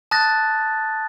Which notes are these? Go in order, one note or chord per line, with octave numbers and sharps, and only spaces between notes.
A5 D#6 F#6 A6 A#6